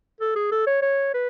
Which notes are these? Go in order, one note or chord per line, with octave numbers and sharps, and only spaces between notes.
A4
G#4
A4
C#5
C#5
B4